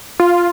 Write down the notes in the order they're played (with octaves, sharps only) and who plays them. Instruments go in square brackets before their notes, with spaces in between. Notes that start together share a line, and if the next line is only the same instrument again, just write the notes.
[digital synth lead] F4